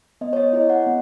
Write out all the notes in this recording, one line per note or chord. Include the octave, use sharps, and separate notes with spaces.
B3 D#5
C#5
D#5
E4 G#4 D#5
F#5
B3